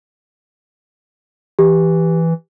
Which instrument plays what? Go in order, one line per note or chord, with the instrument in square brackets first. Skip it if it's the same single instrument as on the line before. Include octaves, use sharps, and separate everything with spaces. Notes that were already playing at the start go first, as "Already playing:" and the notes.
[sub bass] E3 [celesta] G4